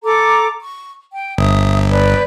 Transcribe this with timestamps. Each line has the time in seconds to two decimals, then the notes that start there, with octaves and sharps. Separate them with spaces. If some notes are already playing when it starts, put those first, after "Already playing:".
0.04 A4 A#5 D6
0.60 C#6
1.10 G5
1.38 G1 E5 D#6
1.88 B4 D5 G6